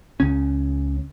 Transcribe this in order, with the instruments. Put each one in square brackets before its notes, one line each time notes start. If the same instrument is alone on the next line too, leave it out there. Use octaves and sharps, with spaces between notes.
[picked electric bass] C#2 C#3 C#4